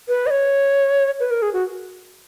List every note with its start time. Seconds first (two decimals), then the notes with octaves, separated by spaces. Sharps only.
0.08 B4
0.27 D#5
0.30 C#5
1.20 B4
1.31 A#4
1.42 G#4
1.53 F#4